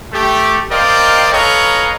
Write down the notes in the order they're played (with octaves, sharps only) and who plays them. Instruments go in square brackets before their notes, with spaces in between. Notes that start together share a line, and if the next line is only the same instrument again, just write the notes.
[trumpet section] A3 G4
A#4 C5 D5 D#5 F5 G5
A4 B4 C#5 D#5 F5 A#5